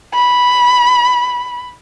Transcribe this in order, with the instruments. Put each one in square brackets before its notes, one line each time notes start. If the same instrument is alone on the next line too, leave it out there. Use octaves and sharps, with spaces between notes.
[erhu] B5